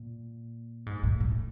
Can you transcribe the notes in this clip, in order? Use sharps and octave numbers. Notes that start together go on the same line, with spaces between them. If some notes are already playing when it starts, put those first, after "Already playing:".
Already playing: A#2
G#2
A2
A2